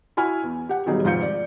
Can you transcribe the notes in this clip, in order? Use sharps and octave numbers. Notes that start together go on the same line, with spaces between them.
E4 F#4 G#5 B5 F6
E2
G4 F#5
D#1 E2 F#3 G3 D#4 G#4
F1 G#2 F4 F5 G6 C#7
D5